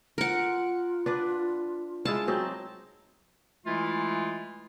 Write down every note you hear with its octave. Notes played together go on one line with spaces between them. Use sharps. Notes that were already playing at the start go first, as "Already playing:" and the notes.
F4 A#4 F#5
D4 B4 D5
G#3 E4 F4 A5
F#3 C4 D#4
E3 G#3 A3 E4 F4